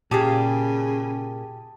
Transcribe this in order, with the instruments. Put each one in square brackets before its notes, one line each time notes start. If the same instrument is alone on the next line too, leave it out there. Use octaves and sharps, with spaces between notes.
[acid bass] A#2 [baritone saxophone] C#3 [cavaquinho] G4 G#4 [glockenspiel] A5 D#6 A6